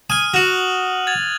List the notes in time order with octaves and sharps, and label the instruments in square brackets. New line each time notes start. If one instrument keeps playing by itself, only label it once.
[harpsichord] G#5 [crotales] D#6 F6 D#7
[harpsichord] F#4 [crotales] F#6 F7 F#7
[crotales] G#6 A6 F7